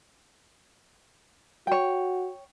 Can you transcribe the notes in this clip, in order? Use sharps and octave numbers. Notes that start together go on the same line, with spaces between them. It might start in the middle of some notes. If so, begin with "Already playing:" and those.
F#4 C#5 G5